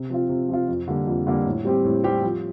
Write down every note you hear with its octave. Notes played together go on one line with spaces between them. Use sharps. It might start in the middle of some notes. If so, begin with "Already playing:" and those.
Already playing: C3
F3 C4 F4
C3
F3 C4 F4
F2
D3 G3 A#3
F2
D3 G3 A#3
A2
G3 C4 G4
A2
G3 C4 G4
F3